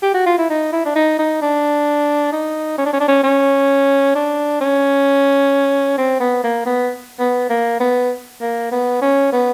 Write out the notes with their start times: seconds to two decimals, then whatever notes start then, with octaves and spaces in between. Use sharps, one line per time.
0.02 G4
0.14 F#4
0.26 F4
0.38 E4
0.50 D#4
0.73 E4
0.85 D4
0.95 D#4
1.19 D#4
1.42 D4
2.32 D#4
2.78 C#4
2.86 D4
2.93 C#4
3.00 D4
3.08 C#4
3.23 C#4
4.15 D4
4.61 C#4
5.98 C4
6.20 B3
6.44 A#3
6.66 B3
7.20 B3
7.50 A#3
7.80 B3
8.41 A#3
8.72 B3
9.01 C#4
9.32 B3